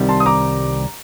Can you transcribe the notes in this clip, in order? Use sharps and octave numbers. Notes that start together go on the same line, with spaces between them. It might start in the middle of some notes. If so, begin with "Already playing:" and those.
Already playing: C2 C3 D#3 G3
A5 C6
D#6
A#5 D6